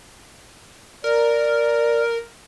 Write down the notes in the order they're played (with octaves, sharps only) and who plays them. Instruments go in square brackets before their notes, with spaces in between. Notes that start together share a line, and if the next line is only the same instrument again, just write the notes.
[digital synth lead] A#4 [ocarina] D5